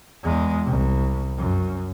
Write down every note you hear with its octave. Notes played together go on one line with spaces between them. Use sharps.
E2 G#3
C2
F#2